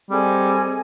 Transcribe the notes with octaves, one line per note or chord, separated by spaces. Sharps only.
G3 C4 G#4 A4 D#5